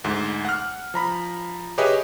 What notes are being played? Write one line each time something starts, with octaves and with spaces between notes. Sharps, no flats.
D2 G#2
F#5 F6
F3 A#5 B5
G4 G#4 B4 C#5 D#5 E5